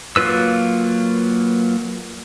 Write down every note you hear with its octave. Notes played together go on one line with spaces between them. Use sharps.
F#3 A#3 F4 B4 E6